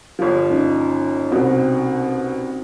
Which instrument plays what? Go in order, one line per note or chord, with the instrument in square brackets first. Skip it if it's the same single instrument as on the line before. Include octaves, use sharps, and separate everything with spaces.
[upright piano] G1 F3
[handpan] A#3 C#4 D#4
[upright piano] C2 B2 [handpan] C4 F#4